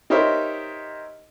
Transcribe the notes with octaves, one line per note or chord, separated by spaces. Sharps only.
D#4 G4 A#4 C5 C#5 E5